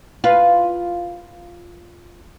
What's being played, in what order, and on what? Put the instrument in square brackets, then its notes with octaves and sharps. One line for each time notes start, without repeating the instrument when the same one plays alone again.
[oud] F4 B4